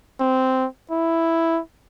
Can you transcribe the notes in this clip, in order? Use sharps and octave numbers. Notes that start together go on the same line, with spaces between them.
C4
E4